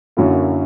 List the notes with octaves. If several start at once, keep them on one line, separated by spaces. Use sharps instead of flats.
F#2 D3 F#3 A#3 E4 F#4